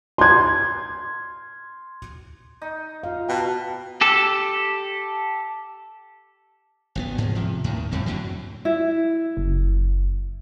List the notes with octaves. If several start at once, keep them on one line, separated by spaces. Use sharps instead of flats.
C6 G#6
D#4
F4 F5
B2 G5 A5
G4 A4
G#1 D#3 B3
G#2 F3 G#3
C3 F3
D#2 A2 D#3
F2 A2 G3 C4
F#2 A2 D3 F#3
E4
F#1